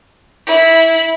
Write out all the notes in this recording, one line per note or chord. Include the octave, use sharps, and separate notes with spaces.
E4